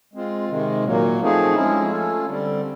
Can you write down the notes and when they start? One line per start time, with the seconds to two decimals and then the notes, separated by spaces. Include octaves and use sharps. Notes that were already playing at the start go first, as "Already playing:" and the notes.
0.13 G#3 C4 F4
0.49 C3 D#3 G#3
0.84 A#2 F#3 A#3
1.20 F3 A3 C4 D#4 G#4
1.55 F3 G#3 C#4 E4
1.90 A3 C#4 F4 A4
2.26 D3 G3 C4